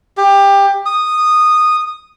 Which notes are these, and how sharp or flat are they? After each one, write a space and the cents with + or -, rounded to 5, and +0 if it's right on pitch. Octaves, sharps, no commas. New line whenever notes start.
G4 +20
D#6 -10